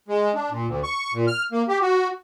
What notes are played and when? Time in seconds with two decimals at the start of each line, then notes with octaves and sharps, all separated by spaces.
0.08 G#3
0.35 D4
0.50 A#2
0.67 D2
0.83 C#6
1.14 A#2
1.27 F6
1.52 A#3
1.68 G4
1.82 F#4